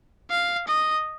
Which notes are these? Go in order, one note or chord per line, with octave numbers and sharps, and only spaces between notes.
F5
D#5